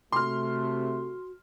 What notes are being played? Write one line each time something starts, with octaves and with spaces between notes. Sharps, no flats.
C3 A3 F#4 C6 F6